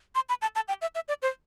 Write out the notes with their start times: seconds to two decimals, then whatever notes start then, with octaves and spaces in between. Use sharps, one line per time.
0.15 C6
0.29 B5
0.42 A5
0.56 A5
0.68 G5
0.82 E5
0.95 E5
1.08 D5
1.22 C5